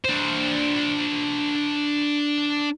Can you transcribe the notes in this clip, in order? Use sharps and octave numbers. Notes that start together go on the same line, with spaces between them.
D4 C5